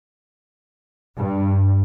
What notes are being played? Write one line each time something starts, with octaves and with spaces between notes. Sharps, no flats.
G2